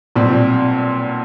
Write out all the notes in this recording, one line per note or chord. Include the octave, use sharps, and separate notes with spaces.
B1 A#2 G3 C4